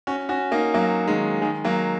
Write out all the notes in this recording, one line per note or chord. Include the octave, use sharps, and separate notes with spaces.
C#4 F#4
C#4 F#4
A#3 D#4
F#3 A#3
D#3 G#3
D#3 G#3
F#3 A#3